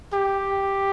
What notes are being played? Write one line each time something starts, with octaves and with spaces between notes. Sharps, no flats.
G4